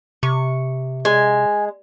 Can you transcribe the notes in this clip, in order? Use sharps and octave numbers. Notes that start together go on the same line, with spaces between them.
C3 C#6
G#3 G#5